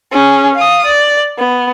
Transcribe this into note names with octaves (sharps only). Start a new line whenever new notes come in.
C#4 G#4
F5 D#6
D5
B3